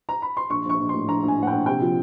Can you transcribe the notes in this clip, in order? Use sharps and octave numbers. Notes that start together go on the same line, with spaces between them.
A#5
B5
C6
A#1 C#6
A#1 C#6
A#1
C6
A2
A#1 A#5
A#1
G#5
A2 F#5
A#1 G5
C3 G5
F3